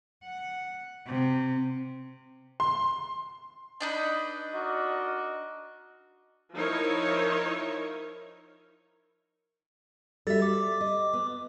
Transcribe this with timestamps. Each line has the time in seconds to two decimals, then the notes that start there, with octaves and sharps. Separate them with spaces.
0.24 F#5
1.06 C3
2.60 C6
3.80 D4 D#4 B4 D#5
4.54 F#4 A#4 D5 D#5
6.54 F3 D#4 E4 A#4 C#5
10.27 G3 F#4 A4 E5 A6
10.42 D6
10.81 D#5
11.13 B3